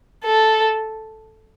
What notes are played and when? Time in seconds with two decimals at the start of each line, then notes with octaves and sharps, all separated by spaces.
0.25 A4